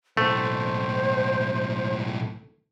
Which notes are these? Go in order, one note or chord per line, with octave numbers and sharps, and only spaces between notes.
B1 A2 A3 C5